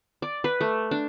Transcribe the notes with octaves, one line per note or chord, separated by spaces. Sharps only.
D5
B4
A3
D4